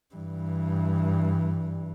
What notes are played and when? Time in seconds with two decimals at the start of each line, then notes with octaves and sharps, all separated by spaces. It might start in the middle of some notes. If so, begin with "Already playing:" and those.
0.15 G2 E3